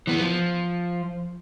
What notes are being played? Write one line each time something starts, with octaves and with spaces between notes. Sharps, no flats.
E3 B3
F3